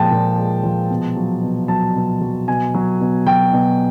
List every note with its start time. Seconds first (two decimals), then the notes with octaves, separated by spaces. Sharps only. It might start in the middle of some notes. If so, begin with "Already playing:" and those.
Already playing: A#2 F3 G#3 G5 A5
0.11 A#2
0.38 G#3
0.63 F3
0.90 B2
1.16 F#3
1.42 B2
1.68 F#3 A5
1.96 B2
2.21 F#3
2.48 B2 G#5
2.74 F#3
3.01 B2
3.26 F#3 G5
3.53 B2